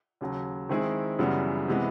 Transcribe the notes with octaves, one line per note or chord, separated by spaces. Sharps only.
D#2 C#3 F#3
D#3 G#3 C4 E4 G#4
F#2 C#3 E3 G3 B3
C3 E3 G#3 B3